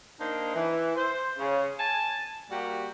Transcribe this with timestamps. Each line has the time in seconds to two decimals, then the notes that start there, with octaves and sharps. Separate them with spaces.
0.20 A#3 D4 D#4 C5
0.55 E3
0.96 C5
1.38 C#3
1.79 G#5 A5
2.50 G3 A#3 F#4 G4